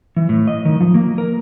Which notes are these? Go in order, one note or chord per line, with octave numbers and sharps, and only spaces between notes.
E3
A2
D#5
D#3
F3
A#3
A#4